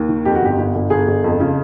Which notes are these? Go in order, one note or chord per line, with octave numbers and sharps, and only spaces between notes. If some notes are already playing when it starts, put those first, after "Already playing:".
Already playing: D#2
D#3
F2 G4
F#4
G1 G4
G1
G1
G1 G#4
G1
F2
C#3